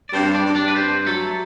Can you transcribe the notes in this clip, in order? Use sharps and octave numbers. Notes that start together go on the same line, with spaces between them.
D5
G2 C4 C5
D4 D5
G2
D4 D5
B4
G2 C4 C5
F#3 A3 A4